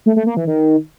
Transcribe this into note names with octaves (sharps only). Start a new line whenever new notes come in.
A3
A3
A#3
E3
D#3